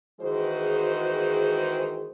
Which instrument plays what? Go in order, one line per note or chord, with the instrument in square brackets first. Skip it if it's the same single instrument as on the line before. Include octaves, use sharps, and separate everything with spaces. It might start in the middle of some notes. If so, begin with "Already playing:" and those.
[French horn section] D#3 E3 G#3 F#4 G#4 C5